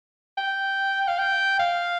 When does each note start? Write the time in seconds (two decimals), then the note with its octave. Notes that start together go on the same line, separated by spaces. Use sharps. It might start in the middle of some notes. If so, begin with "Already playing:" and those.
0.38 G5
1.08 F5
1.19 G5
1.59 F5